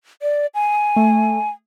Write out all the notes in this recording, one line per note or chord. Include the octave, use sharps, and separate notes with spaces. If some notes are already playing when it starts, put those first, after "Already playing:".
D5
G#5
A3